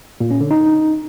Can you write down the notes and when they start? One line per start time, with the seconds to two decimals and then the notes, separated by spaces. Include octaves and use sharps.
0.20 A#2
0.31 C#4
0.41 D3
0.51 D#4